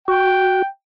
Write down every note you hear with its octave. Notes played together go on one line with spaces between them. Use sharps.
F#4 G5